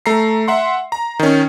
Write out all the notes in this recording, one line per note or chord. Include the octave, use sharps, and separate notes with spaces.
A3 A#5 C7
E5 F#5 C6
A#5
D#3 C#4